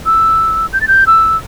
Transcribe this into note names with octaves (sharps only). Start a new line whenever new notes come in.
E6
G6
A6
G6
E6